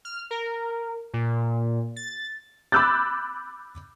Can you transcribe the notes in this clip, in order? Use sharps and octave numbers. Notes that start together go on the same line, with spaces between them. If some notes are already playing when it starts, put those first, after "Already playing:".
F6
A#4
A#2
A6
B5 D6 E6 F#6 G6 A6